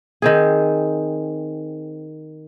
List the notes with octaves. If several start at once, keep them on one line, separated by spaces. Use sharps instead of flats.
D#3 C4 G#4